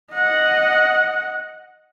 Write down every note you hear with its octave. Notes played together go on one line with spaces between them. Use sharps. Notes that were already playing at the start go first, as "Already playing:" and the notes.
D#5 F#5